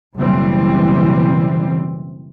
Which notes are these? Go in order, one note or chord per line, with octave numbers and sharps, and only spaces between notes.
F#1 B2 E3 G3 C4